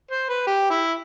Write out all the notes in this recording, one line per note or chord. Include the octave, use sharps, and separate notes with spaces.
C5
B4
G4
E4